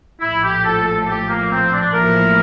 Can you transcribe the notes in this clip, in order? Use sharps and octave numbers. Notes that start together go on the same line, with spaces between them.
A#1 A2 F3 E4
G4
A4
A4
G4
A#3
C4
D4
A1 A2 F3 A#3 E4 A#4